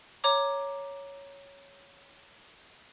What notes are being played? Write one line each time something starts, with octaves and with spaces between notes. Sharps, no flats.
C#5 A#5 D6